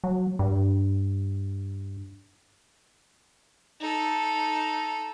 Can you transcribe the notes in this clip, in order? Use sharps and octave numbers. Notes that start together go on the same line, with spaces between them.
F#3
G2
D#4 A4